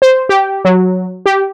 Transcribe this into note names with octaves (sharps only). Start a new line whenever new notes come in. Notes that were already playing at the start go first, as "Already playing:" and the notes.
C5
G4
F#3
G4